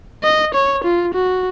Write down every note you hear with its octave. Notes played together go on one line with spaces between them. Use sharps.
D#5
C#5
F4
F#4